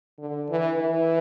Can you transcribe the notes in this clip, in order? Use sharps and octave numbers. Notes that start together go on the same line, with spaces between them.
D3
E3
E3